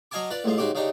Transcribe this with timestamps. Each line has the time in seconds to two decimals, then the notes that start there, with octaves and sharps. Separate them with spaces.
0.11 F#3 D#5 F5 G#5 A5 D6
0.30 F4 B4 D5
0.44 A1 A2 G#3 F4
0.58 G#2 C#3 F#4 G4 D6
0.75 C#3 D4 D#4 G4